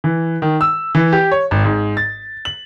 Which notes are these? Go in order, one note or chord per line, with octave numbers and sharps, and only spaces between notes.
E3
D#3
E6
E3
G4
C#5
G#1
G#2
A6
F#7